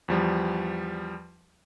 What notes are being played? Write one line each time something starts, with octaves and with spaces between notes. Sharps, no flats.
E2 F3 G3